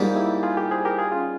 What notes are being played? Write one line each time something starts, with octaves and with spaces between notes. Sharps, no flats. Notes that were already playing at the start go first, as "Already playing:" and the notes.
Already playing: G#2 G3 A#3 F4 G#4
E4 G4
F4 G#4
G4 A#4
G#4 C5
G4 A#4
F4 G#4
C#4 F4